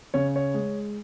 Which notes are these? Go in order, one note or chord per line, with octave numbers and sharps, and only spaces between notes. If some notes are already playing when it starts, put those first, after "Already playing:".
C#3 C#5
C#5
G#3